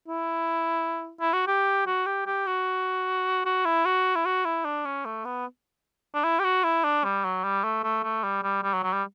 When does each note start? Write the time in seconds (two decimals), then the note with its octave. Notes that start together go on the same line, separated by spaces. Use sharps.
0.08 E4
1.20 E4
1.33 F#4
1.47 G4
1.86 F#4
2.06 G4
2.26 G4
2.47 F#4
3.46 F#4
3.65 E4
3.85 F#4
4.15 E4
4.26 F#4
4.45 E4
4.65 D4
4.85 C#4
5.05 A3
5.25 B3
6.14 D4
6.24 E4
6.39 G4
6.44 F#4
6.64 E4
6.84 D4
7.04 G3
7.24 F#3
7.44 G3
7.64 A3
7.83 A3
8.04 A3
8.24 G3
8.43 G3
8.63 G3
8.73 F#3
8.83 F#3
8.93 G3